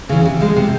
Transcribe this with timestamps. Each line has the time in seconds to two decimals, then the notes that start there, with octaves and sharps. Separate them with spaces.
0.09 C#3 E3
0.25 C3
0.41 F3 G#3
0.56 C3